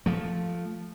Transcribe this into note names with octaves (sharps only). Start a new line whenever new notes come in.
F3 A3